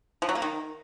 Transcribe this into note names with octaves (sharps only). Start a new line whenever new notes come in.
F3
F#3
A#3
D#3